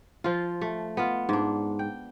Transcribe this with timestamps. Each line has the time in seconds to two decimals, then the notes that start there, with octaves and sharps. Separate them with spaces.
0.24 F3 F4
0.61 A3
0.97 B3 F4
1.29 G#2 D4
1.79 G5